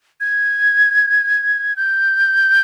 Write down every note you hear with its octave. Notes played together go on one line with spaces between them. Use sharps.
G#6
G6